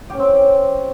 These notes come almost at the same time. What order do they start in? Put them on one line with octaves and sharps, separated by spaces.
G4 C#4 C4